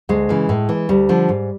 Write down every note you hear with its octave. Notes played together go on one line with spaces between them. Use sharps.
D2 G#3
C#3 E3
A2
E3
D2 G3
D3 F3
G#2